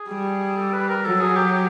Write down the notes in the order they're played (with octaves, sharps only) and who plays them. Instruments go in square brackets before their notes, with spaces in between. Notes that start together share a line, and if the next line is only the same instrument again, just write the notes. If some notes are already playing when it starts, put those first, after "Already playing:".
Already playing: [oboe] G#4
[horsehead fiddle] G3
[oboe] A4
B4
A#4
[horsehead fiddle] F#3 [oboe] A4
[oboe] G#4
G4
G4